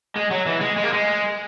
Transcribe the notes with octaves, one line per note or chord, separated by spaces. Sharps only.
G#3
F#3
E3
G#3
G#3
A#3
G#3